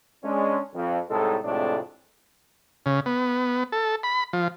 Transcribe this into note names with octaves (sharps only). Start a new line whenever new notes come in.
G#3 C#4 D4
F2
C2 A2 G#3 D#4 A4
F2 A2 C3 G#3 A3 D4
C#3
B3
A4
B5
F3